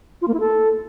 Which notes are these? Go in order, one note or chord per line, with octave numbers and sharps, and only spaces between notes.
F4
A#3
E4
A4